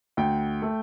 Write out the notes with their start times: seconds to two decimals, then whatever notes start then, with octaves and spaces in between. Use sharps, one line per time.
0.17 D2 G5
0.62 A3